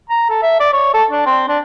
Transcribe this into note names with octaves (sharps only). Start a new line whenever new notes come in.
A#5
A4
E5
D5
C#5
A4
D4
C4
D4